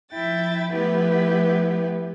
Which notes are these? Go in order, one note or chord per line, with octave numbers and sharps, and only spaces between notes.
F3 E4 E5 G5 A6
F3 A3 B3 E4 G4 B4